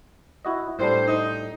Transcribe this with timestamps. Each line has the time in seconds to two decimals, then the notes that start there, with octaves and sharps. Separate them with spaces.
0.45 E4 F#4 D#5
0.79 A2 G3 D4 C5
1.05 D#4